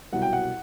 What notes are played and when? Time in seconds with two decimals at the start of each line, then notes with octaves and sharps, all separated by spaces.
0.13 C2 B2 F#3 F#5
0.22 G5
0.33 F#5